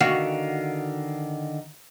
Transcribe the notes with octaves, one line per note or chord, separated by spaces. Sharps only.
D3 D#3 F#4 F5